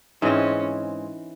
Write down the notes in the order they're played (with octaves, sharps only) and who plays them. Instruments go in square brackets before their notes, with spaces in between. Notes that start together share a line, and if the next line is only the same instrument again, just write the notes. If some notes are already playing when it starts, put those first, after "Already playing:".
[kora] G#2 E3 G#3 C4 [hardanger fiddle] C#4